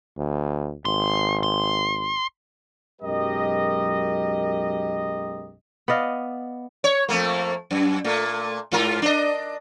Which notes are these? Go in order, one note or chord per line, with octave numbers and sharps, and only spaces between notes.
D2
G#1 C6
C6
B1 F#2 G#3 G4 A#4 D#5
B3 D5 D#5 F5
C#5
F2 A3 A#3
F#2
A#2 A3
G#2 F4 A#4
D4 D#5